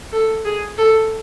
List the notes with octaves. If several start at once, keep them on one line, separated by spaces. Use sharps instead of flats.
A4
G#4
A4